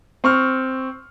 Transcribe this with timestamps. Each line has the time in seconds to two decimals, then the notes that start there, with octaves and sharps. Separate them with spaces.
0.24 C4 C#6 F6